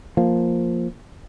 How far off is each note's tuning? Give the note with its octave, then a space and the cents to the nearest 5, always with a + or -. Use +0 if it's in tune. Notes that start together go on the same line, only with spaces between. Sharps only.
F3 +0 A#3 +0